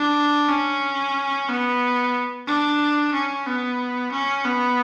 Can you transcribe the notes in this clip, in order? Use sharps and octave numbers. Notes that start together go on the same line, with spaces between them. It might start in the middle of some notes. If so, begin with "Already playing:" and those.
Already playing: D4
C#4
B3
D4
C#4
B3
C#4
B3